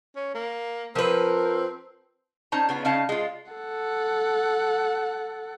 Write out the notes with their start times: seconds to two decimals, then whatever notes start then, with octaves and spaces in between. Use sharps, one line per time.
0.16 C#4
0.34 A#3
0.95 F3 C4 A#4 B4
2.52 C#4 D#4 C5 A5 A#5
2.69 C#3 B3 F4
2.85 C#3 C#4 D#4 F5 A5
3.09 G#3 F4
3.52 A4 F#5